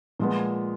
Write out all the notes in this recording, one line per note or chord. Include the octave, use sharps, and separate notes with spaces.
A#2 F3 G#3 B3